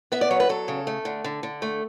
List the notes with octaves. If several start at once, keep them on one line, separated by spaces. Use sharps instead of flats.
B3 E5
D5
F#3 C#5
B4
F#3 A4
C#3
A3
D3
D3
D3
A3